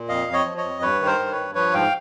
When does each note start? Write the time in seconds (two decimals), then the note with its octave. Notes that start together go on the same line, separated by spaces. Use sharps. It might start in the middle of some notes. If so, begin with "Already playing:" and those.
Already playing: A#2
0.08 F2 D#5 F5
0.27 F2
0.33 C#5 D#5
0.45 F3
0.57 C#5 D#5
0.64 F2
0.82 G2 B4 C#5
1.00 D#3
1.07 A#4 C5
1.19 G2
1.31 B4 C#5
1.37 G2
1.55 F3 B4 C#5
1.74 G#2 F5 G5